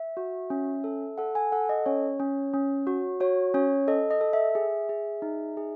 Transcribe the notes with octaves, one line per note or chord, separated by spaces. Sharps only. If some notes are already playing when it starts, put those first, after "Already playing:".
Already playing: E5
F#4
C#4
A4
A4 F#5
G#5
A4 F#5
D#5
C#4 C#5
C#4
C#4
F#4
F#4 C#5
C#4 C#5
A4 D#5
D#5
A4
E5
G#4
G#4
D#4
G#4